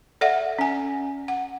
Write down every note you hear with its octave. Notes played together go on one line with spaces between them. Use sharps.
A4 D5 E5 F#5
C#4 G#5
F#5